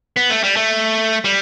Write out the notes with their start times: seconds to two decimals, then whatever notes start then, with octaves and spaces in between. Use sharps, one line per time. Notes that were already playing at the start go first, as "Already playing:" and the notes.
0.16 B3
0.30 A3
0.43 G3
0.56 A3
1.24 G3